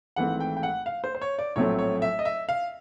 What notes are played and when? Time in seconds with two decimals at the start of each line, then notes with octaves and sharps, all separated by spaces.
0.16 G#1 G#2 E3 A3 C4 F#5
0.40 G5
0.57 G5
0.63 F#5
0.86 F5
1.04 C5
1.15 C5
1.22 C#5
1.39 D5
1.56 A#1 A2 F#3 A3 C4 C#5
1.79 C#5
2.02 E5
2.19 D#5
2.25 E5
2.49 F5